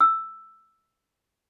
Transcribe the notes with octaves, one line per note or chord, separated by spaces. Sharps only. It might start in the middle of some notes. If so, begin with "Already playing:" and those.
E6